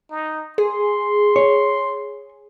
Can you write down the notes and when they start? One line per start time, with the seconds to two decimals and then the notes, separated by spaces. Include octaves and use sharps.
0.11 D#4
0.58 G#4 C6
1.36 C#5